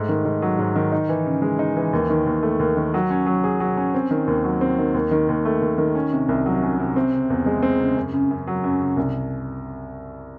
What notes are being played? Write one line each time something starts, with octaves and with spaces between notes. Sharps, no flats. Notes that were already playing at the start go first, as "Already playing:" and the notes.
Already playing: G#2 A3
D#3
G#2
F#3
G#2
D#3
D#4
E3
C#3
G#3
D#4
E3
D#2
D#3
D#2
A3
D#2
D#3
F#3
C#4
F#3
G#4
F#3
C#4
C4
D#3
D#2
F#3
C4
D#3
D#2
D#3
D#2
A3
D#2
D#3
C#4
C3
C2
F#3
C#4
C3
C4
C#3
E2
G#3
C4
C#3
F#2
C#3
F#2
F#3
F#2
C#3
C2